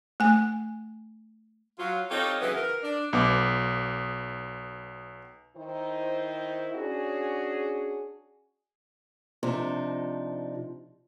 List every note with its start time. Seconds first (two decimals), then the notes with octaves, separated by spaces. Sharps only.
0.20 A3 G#5
1.79 F#3 F4
2.10 C4 D#4 F4 G4 A4 C#5
2.41 C#3 E3 F#3 B3
2.56 A#4
2.82 D4
3.13 B1 B3 D6
5.56 D#3 D#4 E4 C5
6.75 C#4 D4 F#4 G#4
9.43 C3 F3 D4 D#4